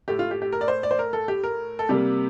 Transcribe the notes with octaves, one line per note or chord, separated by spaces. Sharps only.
A2 A3 G4
F4
G4
G4
A#4
D5
C5
D5
C5
A#4
A4
G4
A#4
A4
C3 G3 A#3 G4